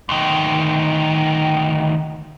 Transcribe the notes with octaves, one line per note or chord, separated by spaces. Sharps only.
D2 D#3